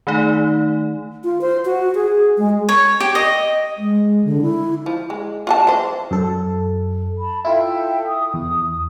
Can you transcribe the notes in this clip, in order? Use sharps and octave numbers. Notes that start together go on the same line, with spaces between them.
D#3 A3 D#4
F4
C5
F#4
G#4
G#3
C#5
G4
D#5
G#3
D3
E4
F3
G#3
F4 F#4 A5
E3 C5
F#2 A4
A5 B5
E4 F4 A4 E5 G5
D#6
E2